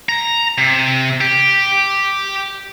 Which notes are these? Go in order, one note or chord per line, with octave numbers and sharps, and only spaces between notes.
A#5
C3
G4